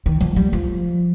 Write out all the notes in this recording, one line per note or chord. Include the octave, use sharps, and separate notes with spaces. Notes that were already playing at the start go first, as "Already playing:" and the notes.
D#3
F3
G3
F3